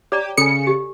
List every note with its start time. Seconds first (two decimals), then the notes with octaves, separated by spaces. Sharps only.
0.12 G4 C#5 D5 A#5
0.37 C#3 A4 G#5 C#7
0.67 G4